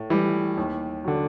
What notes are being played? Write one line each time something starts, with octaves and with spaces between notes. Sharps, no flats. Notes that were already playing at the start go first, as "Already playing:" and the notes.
Already playing: A2
E3 G3
D#2
D3 F#3